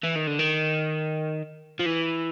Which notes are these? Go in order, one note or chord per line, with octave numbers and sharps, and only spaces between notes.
E3
D#3
D3
D#3
F3
E3